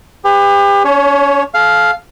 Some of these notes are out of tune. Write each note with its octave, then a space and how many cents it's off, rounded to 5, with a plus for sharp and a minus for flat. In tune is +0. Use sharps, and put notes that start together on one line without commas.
G4 +35 B4 +30
C#4 +40 C#5 +0
A4 -40 F5 +0